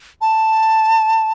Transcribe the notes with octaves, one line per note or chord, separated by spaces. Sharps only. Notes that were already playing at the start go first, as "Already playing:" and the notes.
A5